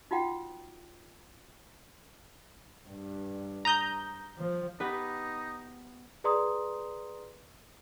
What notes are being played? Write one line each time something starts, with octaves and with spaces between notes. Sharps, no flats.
D#4 F4 F#4 F#5 G5
G2
A#5 D#6 G6
F3
B3 D#4 G4 B4
G#4 B4 D5 A#5 C6 D#6